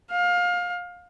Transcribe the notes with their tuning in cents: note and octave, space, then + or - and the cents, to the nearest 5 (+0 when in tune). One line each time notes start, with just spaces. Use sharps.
F5 +25